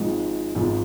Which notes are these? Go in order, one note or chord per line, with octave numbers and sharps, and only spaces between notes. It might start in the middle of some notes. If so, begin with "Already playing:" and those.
Already playing: G#1 G#2 F3 G#3
G#1 G#2 F3 G#3